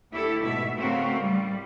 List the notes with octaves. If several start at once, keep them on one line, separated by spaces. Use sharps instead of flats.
D2 E4 G4 A4
G#2 B2 E5
C#3 A3 C4 F#4 A#4 F5
A2 G3